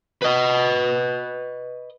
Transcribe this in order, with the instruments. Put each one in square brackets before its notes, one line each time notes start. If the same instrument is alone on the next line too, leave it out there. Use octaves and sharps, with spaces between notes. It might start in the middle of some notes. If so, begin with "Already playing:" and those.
[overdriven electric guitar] B4 D#5